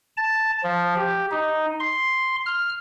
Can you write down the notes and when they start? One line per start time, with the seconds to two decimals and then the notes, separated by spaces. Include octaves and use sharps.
0.17 A5
0.64 F3
0.96 G4
1.31 D#4
1.80 C6
2.46 F6